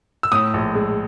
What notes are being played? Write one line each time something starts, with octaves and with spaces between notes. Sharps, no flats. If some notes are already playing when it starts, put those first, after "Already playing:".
E6
A2 D#6
A#1
G#3